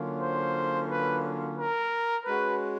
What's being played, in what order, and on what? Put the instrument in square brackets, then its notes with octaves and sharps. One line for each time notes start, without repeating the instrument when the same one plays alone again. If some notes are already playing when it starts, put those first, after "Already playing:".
Already playing: [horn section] D3 F#3 A#3 C#4 F4
[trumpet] C5
B4
A#4
[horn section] G#3 C#4 F#4 [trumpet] B4